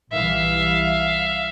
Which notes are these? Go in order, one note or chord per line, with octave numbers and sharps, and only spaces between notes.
B1 E3 G3 E5 F5